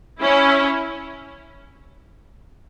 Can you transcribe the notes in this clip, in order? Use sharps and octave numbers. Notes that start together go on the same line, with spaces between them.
C#4 E4